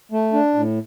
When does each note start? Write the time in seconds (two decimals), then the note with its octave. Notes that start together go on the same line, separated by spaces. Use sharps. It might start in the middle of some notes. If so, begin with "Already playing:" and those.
0.12 A3
0.33 D4
0.54 A2